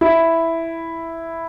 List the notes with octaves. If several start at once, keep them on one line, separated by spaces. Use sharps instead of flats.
E4